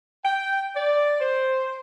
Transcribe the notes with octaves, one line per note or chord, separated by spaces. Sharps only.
G5
D5
C5